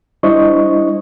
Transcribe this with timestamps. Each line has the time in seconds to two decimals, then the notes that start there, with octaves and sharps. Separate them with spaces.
0.23 G3 D4 E4 C5 D#5 C#6